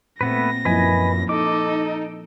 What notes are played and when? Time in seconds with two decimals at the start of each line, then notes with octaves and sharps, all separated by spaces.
0.21 A#2 A3 B3 C4 B4 A#6
0.65 F#2 F3 A#3 E4 B4 D#5 G#5
1.29 D#4 A4 D#5 D6